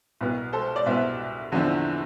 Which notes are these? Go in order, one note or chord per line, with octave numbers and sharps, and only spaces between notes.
C2 B2 B3
A4 C5
D5
C2 B2 B3 C5 E5
E2 D3 F3 C4 E4